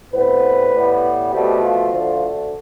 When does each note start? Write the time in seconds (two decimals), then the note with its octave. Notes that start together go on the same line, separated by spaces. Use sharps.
0.14 A2 G3 B3 C4 B4
0.73 A2 G3 B3
1.32 B2 G3 A3 C4 G4
1.61 F3 F4
1.91 D2 D3 A3